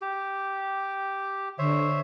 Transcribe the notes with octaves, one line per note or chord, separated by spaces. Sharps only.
G4
D3 C5 C#5 E5